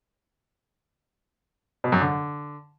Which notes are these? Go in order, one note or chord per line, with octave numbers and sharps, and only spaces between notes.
B2
F#2
D3